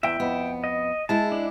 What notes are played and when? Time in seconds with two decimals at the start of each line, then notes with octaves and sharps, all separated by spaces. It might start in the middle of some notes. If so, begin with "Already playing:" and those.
0.03 E2 E5 G5
0.20 F2 B3
0.64 D#5
1.09 G#3 E4 A5
1.32 D4